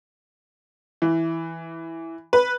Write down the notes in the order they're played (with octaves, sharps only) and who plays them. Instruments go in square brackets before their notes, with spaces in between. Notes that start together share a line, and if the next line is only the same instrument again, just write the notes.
[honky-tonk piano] E3
B4